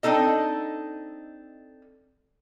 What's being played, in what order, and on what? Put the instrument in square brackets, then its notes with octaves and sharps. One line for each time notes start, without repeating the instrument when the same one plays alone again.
[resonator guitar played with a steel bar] C4 D4 D#4 A4 D#5